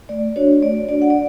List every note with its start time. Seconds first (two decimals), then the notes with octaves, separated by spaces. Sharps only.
0.09 A3 D5
0.36 D4 F#4 C#5
0.62 A3 D5
0.88 D4 F#4 D5
1.02 F#5
1.10 D5